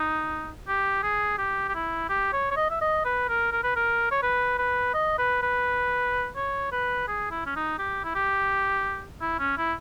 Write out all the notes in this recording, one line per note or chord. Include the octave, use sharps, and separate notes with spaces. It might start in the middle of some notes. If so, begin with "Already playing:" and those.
Already playing: D#4
G4
G#4
G4
G4
E4
G4
C#5
C#5
D#5
E5
D#5
B4
A#4
A#4
B4
A#4
C#5
B4
B4
D#5
B4
B4
C#5
B4
G#4
E4
C#4
D#4
G4
E4
G4
E4
C#4
E4